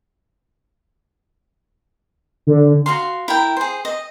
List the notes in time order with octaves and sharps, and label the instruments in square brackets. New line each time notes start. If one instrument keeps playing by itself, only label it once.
[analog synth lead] D3
[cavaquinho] F#4 F5 C6
E4 A#4 G5
G#4 C5
D#5